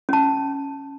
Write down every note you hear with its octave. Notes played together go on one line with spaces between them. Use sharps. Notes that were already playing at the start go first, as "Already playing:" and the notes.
C#4 A5